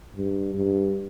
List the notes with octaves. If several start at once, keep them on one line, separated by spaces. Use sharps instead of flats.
G2
G2